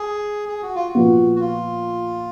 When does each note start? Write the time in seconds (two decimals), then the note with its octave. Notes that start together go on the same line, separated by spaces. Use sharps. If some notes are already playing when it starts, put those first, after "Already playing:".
Already playing: G#4
0.49 G#4
0.62 F#4
0.75 F4
0.88 F#4
0.95 A#2 F3 B3
1.36 F#4
1.40 F4